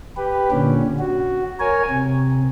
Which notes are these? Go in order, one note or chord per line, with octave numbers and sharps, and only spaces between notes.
G4 B4
A#2 D3 C#4
F#4
A#4 C#5 G#5
C3